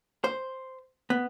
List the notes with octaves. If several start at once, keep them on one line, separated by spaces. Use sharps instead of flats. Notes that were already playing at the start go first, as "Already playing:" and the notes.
C5
B3